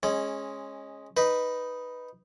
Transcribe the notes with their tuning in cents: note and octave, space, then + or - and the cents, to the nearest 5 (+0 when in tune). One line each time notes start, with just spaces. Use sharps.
G#3 +0 C#4 -15
D#4 +0 B4 +0